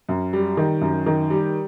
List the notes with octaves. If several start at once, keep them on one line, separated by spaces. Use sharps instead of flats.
F#2
G3
D#3
F#2
D#3
G3